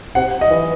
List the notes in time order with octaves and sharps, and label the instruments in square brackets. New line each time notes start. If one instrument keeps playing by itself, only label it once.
[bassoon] C3 [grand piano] F#5
[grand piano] D#5
[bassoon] E3